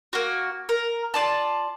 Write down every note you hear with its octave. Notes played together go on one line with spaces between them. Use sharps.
A#3 F#4
A#4
F4 D5 A5